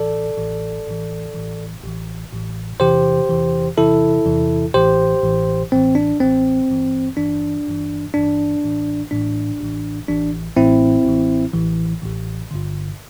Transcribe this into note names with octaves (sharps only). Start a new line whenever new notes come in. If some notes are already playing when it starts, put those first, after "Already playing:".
Already playing: A1 A2 E3 A4 D5
A1 A2 E3
A1 A2 E3
A1 A2 E3
A1 A2 E3
A1 A2 E3
E2 C3 E3 G4 C5
E2 C3 E3
E2 C3 E3 E4 A4
E2 C3 E3
A1 A2 E3 G4 C5
A1 A2 E3
A1 A2 E3 C4
D4
A1 A2 E3 C4
G1 G2 E3
G1 G2 E3 D4
G1 G2 E3
G1 G2 E3 D4
A1 A2 E3
A1 A2 E3 D4
A1 A2 E3
A1 A2 E3 D4
A1 A2 E3 C4 E4
A1 A2 E3
A1 A2 E3
A1 A2 E3
G1 G2 D3